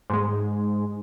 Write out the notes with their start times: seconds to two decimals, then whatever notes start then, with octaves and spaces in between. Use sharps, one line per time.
0.10 G#2 G#3